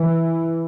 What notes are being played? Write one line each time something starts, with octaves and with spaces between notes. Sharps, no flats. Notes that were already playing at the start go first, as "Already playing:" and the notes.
Already playing: E3